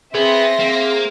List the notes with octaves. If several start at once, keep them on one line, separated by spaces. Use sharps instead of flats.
B3 C4 G#4 E5 C6 A#6
A#3